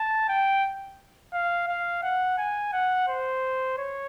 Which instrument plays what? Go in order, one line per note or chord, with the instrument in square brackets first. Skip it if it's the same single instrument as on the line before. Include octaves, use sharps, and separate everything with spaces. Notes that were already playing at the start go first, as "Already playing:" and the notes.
Already playing: [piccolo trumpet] A5
G5
F5
F5
F#5
G#5
F#5
C5
C#5